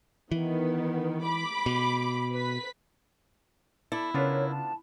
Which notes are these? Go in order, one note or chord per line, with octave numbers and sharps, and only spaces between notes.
D#3 E3 B3
B5 D6
B2
B4 B6
E4 A4 D5
C#3 B3 D4 F4 A#4 C#5
A5